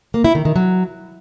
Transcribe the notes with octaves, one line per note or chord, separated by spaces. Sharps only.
A#3
E4
D#3
D#3
F#3